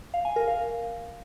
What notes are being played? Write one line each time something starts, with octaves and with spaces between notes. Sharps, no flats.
F5
G#5
A#4
F5